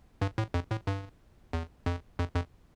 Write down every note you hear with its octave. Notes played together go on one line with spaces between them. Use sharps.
G2
A2
F2
A2
G2
E2
F2
F2
F2